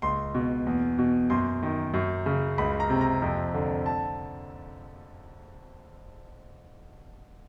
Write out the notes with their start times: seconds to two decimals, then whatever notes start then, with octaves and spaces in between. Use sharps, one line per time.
0.02 C#2 C6
0.35 B2
0.67 E2
0.99 B2
1.30 F#2 C6
1.63 D#3
1.94 F#2
2.26 C#3
2.58 C#2 B5
2.80 A#5
2.90 C3
3.01 A#5
3.22 F2
3.54 D3
3.86 A5